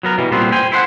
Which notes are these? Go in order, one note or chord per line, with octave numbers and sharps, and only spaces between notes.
F#3 B3 A#4
B2 E3 G3
A#2 G3 B3 C4
C5 G5 G#5
E4 C5 F#5